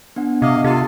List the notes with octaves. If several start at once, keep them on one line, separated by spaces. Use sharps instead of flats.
B3 D4 F#5
C3 D#5 F5
C3 F4 A4 F5